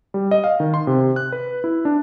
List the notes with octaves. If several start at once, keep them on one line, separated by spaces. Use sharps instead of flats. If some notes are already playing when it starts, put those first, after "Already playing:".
G3
D#5
F5
D#3
C6
C3
F#6
B4
E4
D4